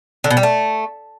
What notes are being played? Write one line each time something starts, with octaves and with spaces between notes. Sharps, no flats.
D3
B2
G3
A3